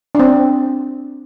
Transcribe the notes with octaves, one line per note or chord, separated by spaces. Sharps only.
D4
C4